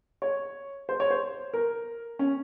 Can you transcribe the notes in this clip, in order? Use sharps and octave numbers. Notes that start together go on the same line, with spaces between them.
C#5
C5
C#5
C5
A#4
C#4